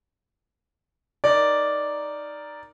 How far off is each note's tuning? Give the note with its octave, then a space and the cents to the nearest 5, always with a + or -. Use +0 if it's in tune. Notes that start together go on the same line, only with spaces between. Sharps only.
D#4 +0 A#4 +0 D5 -5